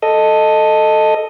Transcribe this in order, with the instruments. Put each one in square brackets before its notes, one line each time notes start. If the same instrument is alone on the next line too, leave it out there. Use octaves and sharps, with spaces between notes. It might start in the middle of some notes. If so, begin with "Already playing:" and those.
[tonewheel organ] A4 D#5